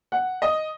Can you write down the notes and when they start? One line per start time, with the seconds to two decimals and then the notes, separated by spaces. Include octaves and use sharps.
0.12 F#5
0.42 D#5